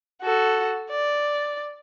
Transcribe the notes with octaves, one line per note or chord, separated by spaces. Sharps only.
F#4 A4
D5